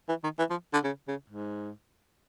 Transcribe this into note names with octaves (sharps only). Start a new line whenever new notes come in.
E3
D#3
E3
F3
D3
C#3
C#3
G#2